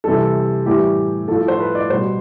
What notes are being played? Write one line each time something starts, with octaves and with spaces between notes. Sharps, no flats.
C3 E3 G3 A4
A2 E3 G3 G4
A2 F3 A4
C5
B4
D5
B2 G3 C5